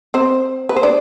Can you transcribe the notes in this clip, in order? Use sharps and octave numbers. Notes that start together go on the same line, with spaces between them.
C4 C5
B4
C5
D4 D5